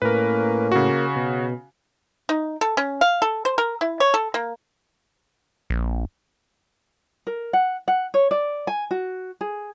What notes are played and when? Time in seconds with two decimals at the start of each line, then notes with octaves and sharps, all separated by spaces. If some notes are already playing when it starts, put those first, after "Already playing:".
0.02 A2 A#3 C#4 A#4 B4
0.72 C#3 F#4
1.16 B2
2.29 D#4
2.61 A4
2.77 C#4
3.01 F5
3.22 A4
3.45 C5
3.58 A#4
3.81 E4
4.00 C#5
4.14 A4
4.34 A#3
5.70 A#1
7.27 A#4
7.53 F#5
7.88 F#5
8.14 C#5
8.31 D5
8.67 G#5
8.91 F#4
9.41 G#4